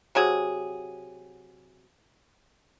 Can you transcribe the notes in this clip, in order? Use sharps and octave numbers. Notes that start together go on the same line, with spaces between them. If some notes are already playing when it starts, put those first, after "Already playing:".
C3 F#3 G#4